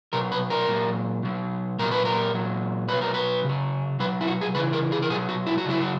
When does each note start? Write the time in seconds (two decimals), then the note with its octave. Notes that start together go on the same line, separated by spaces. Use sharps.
0.13 B2 F#3 A#4
0.32 B4
0.50 A#4
0.68 A#2 F#3
1.23 B2 F#3
1.79 A#2 F#3 A#4
1.91 B4
2.05 A#4
2.34 A#2 F#3
2.89 B2 F#3 B4
3.01 A#4
3.14 B4
3.45 C#3 F#3
4.00 B2 F#3 B4
4.21 E4
4.27 F#4
4.41 G#4
4.55 C#3 E3 B4
4.73 A#4
4.92 G#4
5.02 A#4
5.10 B2 F#3 G#4
5.29 F#4
5.47 E4
5.58 F#4
5.65 C#3 F#3 E4
5.81 F#4